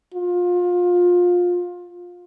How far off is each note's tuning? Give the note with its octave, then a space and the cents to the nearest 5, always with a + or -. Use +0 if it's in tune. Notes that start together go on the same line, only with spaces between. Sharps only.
F4 +25